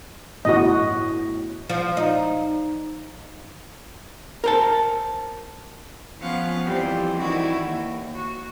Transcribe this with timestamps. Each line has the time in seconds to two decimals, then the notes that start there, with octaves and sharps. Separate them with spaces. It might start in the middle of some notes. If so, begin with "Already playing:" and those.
0.45 G1 F#2 A2 F#4 D#5
1.69 F3
1.97 D#4
4.44 A#4 C5 A5
6.20 F3 B3 C#4 F5 F#5
6.66 F2 E3 G3 C4
7.20 D#3 E3 E4 F#4 D5
7.62 D#2
8.16 F#4